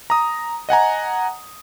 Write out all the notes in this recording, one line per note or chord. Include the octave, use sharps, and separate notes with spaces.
A#5 D#6
D#5 F#5 G#5 A#5